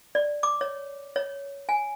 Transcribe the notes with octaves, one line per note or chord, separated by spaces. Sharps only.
D5
D6
C#5
C#5
G#5